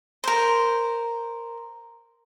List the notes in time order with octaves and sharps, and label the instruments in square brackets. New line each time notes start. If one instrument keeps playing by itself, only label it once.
[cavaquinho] A#4 C5